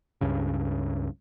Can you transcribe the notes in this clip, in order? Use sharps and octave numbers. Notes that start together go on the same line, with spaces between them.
C#2 G2 C#3